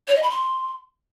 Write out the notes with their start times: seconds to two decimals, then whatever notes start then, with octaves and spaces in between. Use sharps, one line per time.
0.08 C#5
0.15 D#5
0.23 B5
0.30 C6